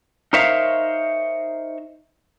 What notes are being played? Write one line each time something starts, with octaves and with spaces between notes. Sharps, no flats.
D#4 A#4 C5 C#5 E5 F5